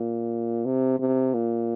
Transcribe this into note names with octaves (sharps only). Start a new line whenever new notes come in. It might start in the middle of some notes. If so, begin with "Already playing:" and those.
Already playing: A#2
C3
C3
A#2